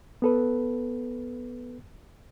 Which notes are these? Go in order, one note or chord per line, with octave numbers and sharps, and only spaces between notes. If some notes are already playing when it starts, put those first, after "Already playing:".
B3 A4 B4